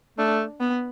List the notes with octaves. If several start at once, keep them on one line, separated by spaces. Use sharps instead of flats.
A3 D4
B3